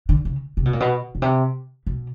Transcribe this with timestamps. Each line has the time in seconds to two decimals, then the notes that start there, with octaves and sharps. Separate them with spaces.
0.09 D3
0.25 C#3
0.57 C3
0.65 B2
0.73 A#2
0.80 B2
1.15 B2
1.22 C3
1.86 B2